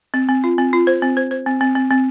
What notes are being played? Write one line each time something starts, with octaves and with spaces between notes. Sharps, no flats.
C4
C4
F4
C4
F4
C5
C4
C5
C5
C4
C4
C4
C4